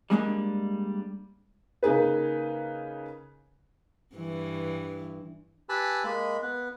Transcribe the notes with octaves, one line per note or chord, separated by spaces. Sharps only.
G3 G#3 A#3 D4
C#3 A#3 D#4 G#4 B4
G2 E3
G4 B4 G#5 A5 B5 E6
G#3 A#3 D#5 B5
B3 B4